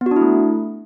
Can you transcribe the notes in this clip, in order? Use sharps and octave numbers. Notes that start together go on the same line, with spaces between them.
B3
F#4
D4
E4
A3